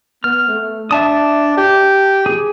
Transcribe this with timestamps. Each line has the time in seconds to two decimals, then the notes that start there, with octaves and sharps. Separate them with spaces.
0.24 B3 F6
0.48 A3
0.91 D4 E5 A5 D#6
1.57 G4
2.26 G#4